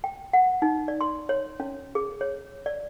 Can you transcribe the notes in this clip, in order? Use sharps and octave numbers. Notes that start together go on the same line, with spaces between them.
G5
F#5
D#4
D5
C6
C#5
C#4
G#4
C#5
D5